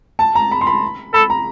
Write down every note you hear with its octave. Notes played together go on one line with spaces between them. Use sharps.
A5
A#5
B5
C6
B5
A4 B5
A#5